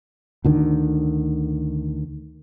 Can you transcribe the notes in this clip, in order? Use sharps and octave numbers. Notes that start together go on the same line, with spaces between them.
D2 D3 D#3